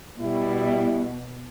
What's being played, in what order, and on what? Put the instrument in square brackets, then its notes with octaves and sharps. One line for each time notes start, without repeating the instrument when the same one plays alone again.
[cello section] B2 [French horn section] G3 E4